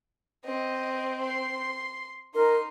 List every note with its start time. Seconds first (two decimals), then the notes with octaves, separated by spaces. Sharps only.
0.45 C4 D#5
1.23 C6
2.35 D#4 A#4 C6